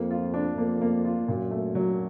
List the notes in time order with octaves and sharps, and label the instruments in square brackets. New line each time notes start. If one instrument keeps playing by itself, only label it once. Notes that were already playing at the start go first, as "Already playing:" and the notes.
Already playing: [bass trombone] F2 [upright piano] A#3
[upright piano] F4
D4
[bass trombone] F2 [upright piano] A#3
[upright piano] A#3
F4
[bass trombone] F#2 [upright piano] A#2
[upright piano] A3
F#3